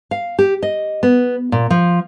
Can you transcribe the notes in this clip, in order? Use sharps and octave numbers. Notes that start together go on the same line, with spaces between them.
F5
G4
D#5
B3
A#2
F3